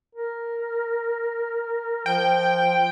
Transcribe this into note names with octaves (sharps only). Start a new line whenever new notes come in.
A#4
F3 G5